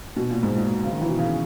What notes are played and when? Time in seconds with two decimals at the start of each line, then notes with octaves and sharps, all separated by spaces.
0.16 B2
0.31 A#2
0.43 G#2
0.57 A#2
0.84 C#3
0.92 D#3
1.01 E3
1.09 B2
1.19 C#3